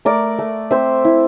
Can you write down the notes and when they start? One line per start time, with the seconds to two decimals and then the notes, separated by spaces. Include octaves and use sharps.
0.05 A3 A#4 D5
0.39 A3
0.71 C4 C5 E5
1.05 E4